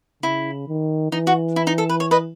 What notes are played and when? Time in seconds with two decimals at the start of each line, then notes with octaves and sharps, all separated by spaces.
0.23 C#3 E4
0.68 D#3
1.12 E3 D#4
1.27 F#4
1.56 E4
1.67 D#4
1.78 A4
1.89 B4
2.00 C#5
2.11 B4 D#5